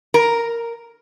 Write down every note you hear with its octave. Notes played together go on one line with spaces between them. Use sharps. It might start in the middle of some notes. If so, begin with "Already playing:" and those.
A#4